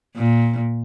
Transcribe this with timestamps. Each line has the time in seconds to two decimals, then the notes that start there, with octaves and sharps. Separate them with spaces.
0.16 A#2